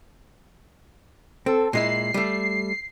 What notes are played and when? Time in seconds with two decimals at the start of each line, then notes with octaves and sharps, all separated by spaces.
1.46 C4 A4
1.73 A#2 G#3 E4 C7
2.14 G3 A3